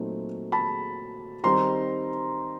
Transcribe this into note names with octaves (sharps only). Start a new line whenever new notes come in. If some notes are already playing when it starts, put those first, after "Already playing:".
Already playing: A#2 F#3 A3 C4 D#4
A5 B5
D#3 G3 C4 D#4 A#5 C6